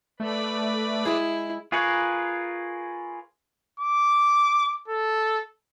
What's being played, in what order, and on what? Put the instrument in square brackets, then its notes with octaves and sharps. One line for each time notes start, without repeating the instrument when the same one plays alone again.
[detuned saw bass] A3 [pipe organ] B4 D5 B5
[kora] G#3 G#4 [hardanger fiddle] E4
[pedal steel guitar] F4 G#4 A#4 B4 C#5
[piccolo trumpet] D6
A4